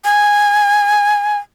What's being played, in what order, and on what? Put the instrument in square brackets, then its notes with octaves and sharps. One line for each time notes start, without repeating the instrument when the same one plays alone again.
[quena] G#5